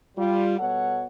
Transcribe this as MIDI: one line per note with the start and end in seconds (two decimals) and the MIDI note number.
0.16 0.58 55
0.16 0.58 65
0.59 1.06 47
0.59 1.06 55
0.59 1.06 69
0.59 1.06 73
0.59 1.06 78